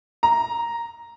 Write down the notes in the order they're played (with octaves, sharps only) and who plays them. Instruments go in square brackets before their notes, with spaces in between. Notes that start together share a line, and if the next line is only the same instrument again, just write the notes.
[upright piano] A#5